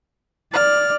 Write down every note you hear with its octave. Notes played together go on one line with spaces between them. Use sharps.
D5 F6